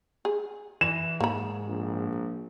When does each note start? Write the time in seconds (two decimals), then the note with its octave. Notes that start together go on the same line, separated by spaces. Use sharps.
0.25 G#4
0.81 E3 E7
1.20 G#2 A#3 B5
1.67 A#1